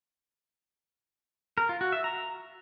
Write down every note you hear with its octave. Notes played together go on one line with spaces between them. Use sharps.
A#4
F4
F#4
E5
A#5